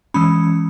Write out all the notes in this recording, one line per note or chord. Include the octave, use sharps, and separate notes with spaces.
E3 G#3 C#4 B5